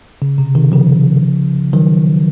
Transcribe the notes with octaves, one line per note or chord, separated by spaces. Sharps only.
C#3
C3
C3 D#3
C#3 F3
D#3 F#3